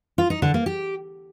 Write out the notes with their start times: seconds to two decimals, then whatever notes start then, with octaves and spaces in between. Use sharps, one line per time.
0.18 F4
0.30 D#4
0.42 D3
0.54 A#3
0.66 G4